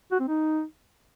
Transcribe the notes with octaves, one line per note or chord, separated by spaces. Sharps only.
F#4
C4
D#4